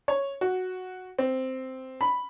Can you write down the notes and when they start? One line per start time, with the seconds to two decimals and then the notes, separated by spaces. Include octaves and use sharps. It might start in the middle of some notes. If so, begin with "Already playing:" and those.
0.08 C#5
0.41 F#4
1.18 C4
2.01 B5